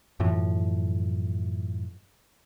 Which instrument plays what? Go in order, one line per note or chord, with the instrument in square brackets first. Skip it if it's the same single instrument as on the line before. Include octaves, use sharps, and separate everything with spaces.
[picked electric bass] F#2 A2 E3 F3